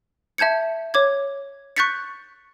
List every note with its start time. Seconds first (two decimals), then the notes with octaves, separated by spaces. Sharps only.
0.38 E5 A5 G6 G#6 C#7
0.94 C#5 D6 G#6
1.76 C#6 F#6 G6 A6 B6 C#7